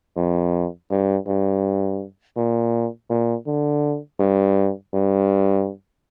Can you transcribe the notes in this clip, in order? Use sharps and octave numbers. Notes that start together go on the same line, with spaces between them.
F2
G2
G2
A#2
A#2
D3
G2
G2